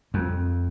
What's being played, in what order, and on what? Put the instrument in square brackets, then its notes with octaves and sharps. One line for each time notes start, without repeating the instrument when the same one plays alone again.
[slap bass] F2